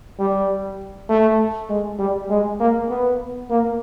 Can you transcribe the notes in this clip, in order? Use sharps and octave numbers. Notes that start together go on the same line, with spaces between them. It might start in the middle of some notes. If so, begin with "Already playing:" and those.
G3
A3
G#3
G3
G#3
A#3
B3
A#3